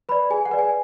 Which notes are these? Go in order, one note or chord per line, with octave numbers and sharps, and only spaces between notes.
B4 D5 B5
G#4 G#5
F#5
B4 D5
G#5